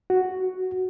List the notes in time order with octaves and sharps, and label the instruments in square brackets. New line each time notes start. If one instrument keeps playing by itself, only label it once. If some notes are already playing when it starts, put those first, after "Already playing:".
[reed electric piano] F#4